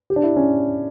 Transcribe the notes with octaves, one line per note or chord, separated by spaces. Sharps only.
G4
D4
E4
C#4